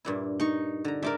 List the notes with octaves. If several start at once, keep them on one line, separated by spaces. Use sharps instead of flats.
G2 A#2 E4
D#4 C#6
D3 A#5
G#2 A#4 D5 E5